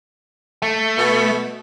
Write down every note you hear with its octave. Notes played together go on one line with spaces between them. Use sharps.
A3
B2